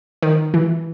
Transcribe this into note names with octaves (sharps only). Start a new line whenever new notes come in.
D#3
E3